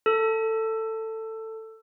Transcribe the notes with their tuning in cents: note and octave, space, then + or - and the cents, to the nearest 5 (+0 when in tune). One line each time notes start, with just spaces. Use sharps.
A4 +15